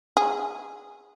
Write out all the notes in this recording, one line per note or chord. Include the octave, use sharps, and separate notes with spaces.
G#4